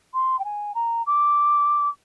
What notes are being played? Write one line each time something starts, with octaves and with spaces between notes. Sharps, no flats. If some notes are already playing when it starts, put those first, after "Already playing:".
C6
G5
G#5
A#5
D6